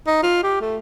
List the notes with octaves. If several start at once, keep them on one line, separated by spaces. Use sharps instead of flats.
D#4
F4
G4
A3